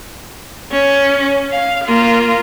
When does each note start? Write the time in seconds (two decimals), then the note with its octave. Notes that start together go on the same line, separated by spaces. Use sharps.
0.72 C#4
1.52 F5
1.84 A#3 F4